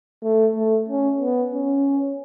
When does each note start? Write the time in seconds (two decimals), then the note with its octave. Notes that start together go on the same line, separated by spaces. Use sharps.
0.23 A3
0.56 A3
0.88 C#4
1.21 B3
1.54 C#4